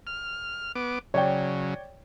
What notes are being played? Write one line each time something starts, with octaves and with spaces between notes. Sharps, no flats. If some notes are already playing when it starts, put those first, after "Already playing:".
F6
B3 D6
C#3 F#3 C#5 D5 G5